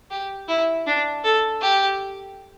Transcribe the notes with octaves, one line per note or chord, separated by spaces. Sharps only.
G4
E4
D4
A4
G4